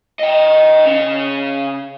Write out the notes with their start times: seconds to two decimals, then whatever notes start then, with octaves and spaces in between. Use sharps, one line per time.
0.19 D#5 G5
0.85 C#3 C#4